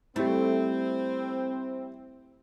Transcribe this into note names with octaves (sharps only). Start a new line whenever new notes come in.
G3 A3 C4 E4